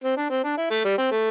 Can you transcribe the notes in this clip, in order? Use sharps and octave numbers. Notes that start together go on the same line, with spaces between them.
C4
D4
C4
D4
E4
A3
G3
C4
A3